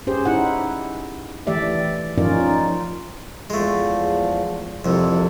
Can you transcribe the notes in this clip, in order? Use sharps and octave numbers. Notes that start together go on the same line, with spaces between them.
C#4 G4 G#4 C5
D#4 E4 F#5
E3 A3 G4 D5 E5
F3 C#4 D#4 F4 A#4 D5
D#4 F4
E2 F3 G#3 A3
C2 F2 C3 E4 A4